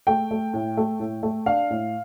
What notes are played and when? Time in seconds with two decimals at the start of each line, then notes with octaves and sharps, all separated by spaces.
0.07 A3 G5
0.31 A3
0.54 A2
0.77 A3
1.00 A2
1.23 A3
1.46 D4 F5
1.70 A2